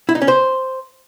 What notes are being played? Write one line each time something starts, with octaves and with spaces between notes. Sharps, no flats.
E4
D#4
C#4
C5